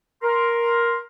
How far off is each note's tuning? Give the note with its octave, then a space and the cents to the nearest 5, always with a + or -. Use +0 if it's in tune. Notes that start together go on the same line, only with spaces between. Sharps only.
A#4 +10 C6 +0